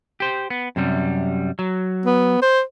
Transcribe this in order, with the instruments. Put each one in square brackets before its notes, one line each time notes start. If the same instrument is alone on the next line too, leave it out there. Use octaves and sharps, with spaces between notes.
[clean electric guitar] G4 C5
B3
F#2 C3 G3
F#3
[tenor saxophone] B3
C5